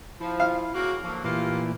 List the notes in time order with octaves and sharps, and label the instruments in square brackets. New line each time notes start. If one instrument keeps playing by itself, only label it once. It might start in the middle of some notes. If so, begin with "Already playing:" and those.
[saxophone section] F3 [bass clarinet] E4
[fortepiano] F5
[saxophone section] C#3 A#3 [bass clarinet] F#4
[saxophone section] D3 F#3 A#3 [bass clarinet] F3
[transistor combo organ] A#2 E3 [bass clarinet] A3 [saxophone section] A#3 F4 G4